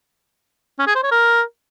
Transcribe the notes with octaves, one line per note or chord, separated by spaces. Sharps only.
C#4
G#4
C5
C#5
A#4